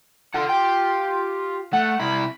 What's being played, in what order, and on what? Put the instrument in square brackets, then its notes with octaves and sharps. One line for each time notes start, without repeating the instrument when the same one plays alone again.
[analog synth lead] F4 [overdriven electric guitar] A4 F#5
[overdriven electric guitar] G4 G5
[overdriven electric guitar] A3 [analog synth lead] F#5
[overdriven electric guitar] C3 E4 [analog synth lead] B5